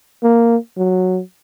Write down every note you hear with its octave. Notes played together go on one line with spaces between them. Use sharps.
A#3
F#3